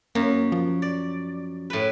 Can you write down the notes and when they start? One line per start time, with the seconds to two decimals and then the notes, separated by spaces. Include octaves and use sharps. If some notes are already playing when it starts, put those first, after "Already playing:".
0.15 F#2 A#3
0.52 F3
0.82 D5
1.70 A2 B4